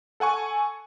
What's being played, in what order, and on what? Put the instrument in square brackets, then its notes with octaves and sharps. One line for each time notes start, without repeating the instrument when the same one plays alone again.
[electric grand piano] A4 F#5 G#5 C#6